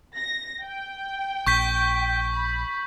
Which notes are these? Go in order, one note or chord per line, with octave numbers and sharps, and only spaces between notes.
A#6
G5
A#1 C#6 G6 B6
B5